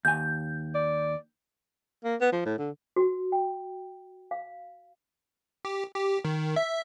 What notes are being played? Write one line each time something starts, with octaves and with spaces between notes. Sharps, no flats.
D#2 G#5 G6
D5
A#3
B3
F3
A2
D3
F#4
G5
F5
G4
G4
D#3
E5